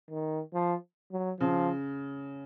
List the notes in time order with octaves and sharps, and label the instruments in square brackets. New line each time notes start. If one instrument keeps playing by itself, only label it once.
[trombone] D#3
F3
F#3
[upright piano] C#3 [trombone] F3